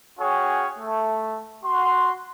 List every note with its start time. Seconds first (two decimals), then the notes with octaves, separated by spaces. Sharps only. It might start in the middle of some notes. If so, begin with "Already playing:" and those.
0.19 C#4 F#4 G#4 C#5 G5
0.78 A3
1.63 F#4 C6